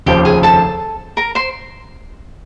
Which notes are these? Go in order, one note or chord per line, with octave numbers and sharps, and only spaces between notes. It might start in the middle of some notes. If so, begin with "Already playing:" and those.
F1 D#2 C#3 F3 G4 G5
G#4 G#5
A4 A5
A#4 A#5
C5 C6